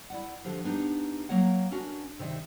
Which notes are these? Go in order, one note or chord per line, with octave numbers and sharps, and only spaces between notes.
E4 D5 F#5
D3 F3 G4
B3 D4 D#4 G4
F#3 A#3 C#5 F#5
C#4 D4 F#4 A#4
C3 D#3 D5 E5